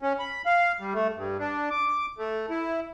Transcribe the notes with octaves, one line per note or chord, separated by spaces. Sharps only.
C#4
B5
F5
G3
A3
G2
D4
D6
A3
E4